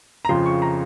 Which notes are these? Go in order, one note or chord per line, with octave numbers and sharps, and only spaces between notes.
A#5
F2 C#3 F3 C6
C#6
A#5